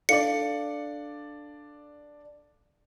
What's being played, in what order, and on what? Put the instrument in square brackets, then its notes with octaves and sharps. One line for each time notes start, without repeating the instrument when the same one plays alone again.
[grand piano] D4 D5 [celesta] A4 F5 [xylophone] C#7